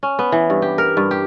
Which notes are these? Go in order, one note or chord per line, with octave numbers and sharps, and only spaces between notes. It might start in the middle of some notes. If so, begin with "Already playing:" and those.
C#4
B3
E3
G2
G4
A#4
G2
G4